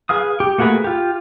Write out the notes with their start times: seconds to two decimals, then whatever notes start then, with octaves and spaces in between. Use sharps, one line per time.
0.09 G#4 B4 F5 D#6
0.40 G4
0.58 A3 A#3 F#4 G#4 B4
0.84 F4 G4